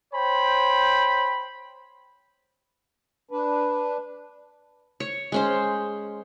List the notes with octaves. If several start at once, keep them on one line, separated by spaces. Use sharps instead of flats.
C5 C#5 G5 B5
D4 B4
C#5
G#3 C#4 C5